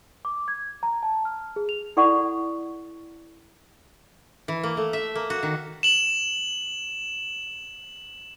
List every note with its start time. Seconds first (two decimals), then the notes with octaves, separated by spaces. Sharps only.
0.25 D6
0.48 G#6
0.83 A#5
1.03 A5
1.25 F6
1.56 G#4
1.69 F7
1.97 E4 A4 D5 F#5 C#6
4.48 E3
4.63 A#3
4.77 A3
4.93 E5
5.15 A#3
5.30 F#4
5.43 D#3
5.83 E7 F#7